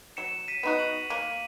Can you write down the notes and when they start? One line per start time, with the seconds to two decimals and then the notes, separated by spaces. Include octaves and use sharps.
0.17 F#3 C#7 E7
0.48 B6 D#7
0.63 B3 D#4 F#4
0.79 D#7 F#7
1.10 A#3 D#7 F#7